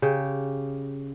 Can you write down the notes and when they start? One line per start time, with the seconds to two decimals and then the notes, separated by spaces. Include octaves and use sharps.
0.02 C#3 G4